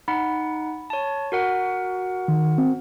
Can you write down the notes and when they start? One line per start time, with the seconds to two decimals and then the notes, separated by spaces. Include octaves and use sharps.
0.08 D#4 F#5 B5
0.90 C#5 A5
1.32 F#4 A#4 F#5
2.28 D#3
2.58 C4